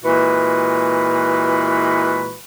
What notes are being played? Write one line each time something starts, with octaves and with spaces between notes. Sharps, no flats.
A#2 E3 G#3 F#4 B4